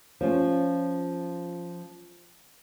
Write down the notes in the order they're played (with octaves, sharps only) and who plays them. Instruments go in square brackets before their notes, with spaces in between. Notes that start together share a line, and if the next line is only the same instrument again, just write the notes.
[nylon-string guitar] F3 C#4 F4